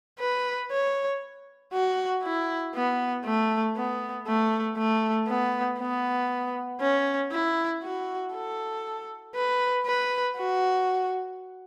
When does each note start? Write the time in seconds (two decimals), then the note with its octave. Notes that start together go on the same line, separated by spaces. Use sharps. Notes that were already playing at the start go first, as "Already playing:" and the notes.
0.20 B4
0.72 C#5
1.73 F#4
2.24 E4
2.75 B3
3.25 A3
3.77 B3
4.27 A3
4.78 A3
5.28 B3
5.79 B3
6.81 C#4
7.32 E4
7.83 F#4
8.34 A4
9.35 B4
9.86 B4
10.37 F#4